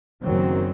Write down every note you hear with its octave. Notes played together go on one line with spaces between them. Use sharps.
F#1 F#2 D#3 F#3 C4